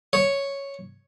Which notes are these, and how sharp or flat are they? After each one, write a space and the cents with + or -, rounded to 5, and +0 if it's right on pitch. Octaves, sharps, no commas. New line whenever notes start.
C#5 +0